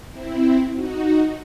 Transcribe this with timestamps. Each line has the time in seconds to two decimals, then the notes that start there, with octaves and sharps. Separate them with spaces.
0.11 C4 E4
0.74 D#4 F#4